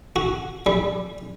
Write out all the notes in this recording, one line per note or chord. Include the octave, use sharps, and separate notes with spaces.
F#4
G3